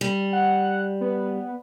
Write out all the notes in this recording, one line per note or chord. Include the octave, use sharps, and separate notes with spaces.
G3
F#5
B3